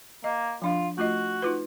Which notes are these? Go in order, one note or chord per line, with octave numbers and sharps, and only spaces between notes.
A#3 D#5
F3 D4 F4 F5
A3 F4 F#4 D#5
D#4 F4 B4